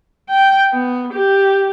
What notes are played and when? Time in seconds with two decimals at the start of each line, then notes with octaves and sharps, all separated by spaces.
0.30 G5
0.73 B3
1.13 G4